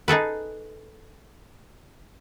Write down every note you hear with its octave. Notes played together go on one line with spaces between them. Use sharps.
D#4 G#4 A4 B4